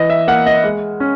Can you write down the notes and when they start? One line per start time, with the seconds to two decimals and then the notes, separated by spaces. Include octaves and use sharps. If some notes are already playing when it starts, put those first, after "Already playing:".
Already playing: E3 D#5
0.10 E5
0.28 A#3 F#5
0.46 D#5
0.64 G#3
1.00 C#4